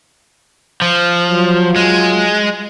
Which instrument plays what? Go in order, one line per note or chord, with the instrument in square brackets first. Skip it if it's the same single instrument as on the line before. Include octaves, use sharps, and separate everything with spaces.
[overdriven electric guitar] F3
[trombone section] F#3 F4
[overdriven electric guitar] G#3